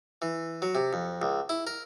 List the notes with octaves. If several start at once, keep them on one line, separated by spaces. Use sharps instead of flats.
E3
F#3
C3
F2
C#2
E4
A#4